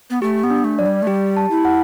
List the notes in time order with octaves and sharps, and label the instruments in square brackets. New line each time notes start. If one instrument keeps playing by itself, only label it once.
[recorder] B3
[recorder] A3 [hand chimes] G4
[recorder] B3
[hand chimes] D4
[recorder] A3
[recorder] F#3 [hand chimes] D5
[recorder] G3
A3
[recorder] G3 [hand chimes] G4
[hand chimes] A5
[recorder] E4
[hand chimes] F#5